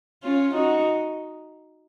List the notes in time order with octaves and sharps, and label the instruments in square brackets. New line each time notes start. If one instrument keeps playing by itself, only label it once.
[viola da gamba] C#4 F4
D#4 F#4